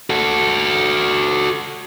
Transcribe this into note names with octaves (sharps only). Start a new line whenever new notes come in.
F#4 A4